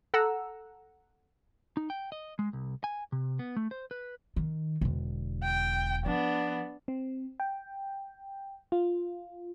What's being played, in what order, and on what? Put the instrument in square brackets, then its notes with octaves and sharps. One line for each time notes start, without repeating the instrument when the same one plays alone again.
[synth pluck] A4 F#5 A#5 E6
[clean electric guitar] D#4
G5
D#5
G#3
C2
G#5
C3
B3
A3
C5
B4
[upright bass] D#3
E1 D3
[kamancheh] G5
[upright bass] F3 [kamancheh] B3 D4
[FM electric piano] C4
G5
F4